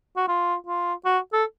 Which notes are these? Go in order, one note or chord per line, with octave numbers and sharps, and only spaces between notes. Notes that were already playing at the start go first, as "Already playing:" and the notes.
F#4
F4
F4
F#4
A4